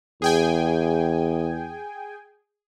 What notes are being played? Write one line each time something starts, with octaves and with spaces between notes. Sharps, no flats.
E2 G#4 G5 G#5